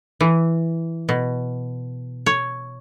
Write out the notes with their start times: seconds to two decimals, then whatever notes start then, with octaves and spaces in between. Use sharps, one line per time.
0.21 E3
1.09 B2
2.26 C#5